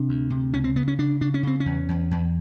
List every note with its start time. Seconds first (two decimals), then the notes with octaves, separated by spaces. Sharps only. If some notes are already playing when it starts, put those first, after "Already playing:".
Already playing: C3 D4
0.09 D2
0.30 C3
0.53 C#2 C#4
0.64 C4
0.76 C#3 B3
0.88 C#4
0.99 C#3 D4
1.21 C#3 D4
1.34 C#4
1.43 C#3 C4
1.60 C#4
1.66 E2
1.89 E2
2.11 E2